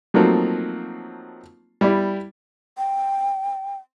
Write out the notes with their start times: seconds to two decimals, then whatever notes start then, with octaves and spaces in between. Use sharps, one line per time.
0.14 F3 F#3 A3 A#3 C4 D#4
1.81 G3 E4 D5
2.78 G5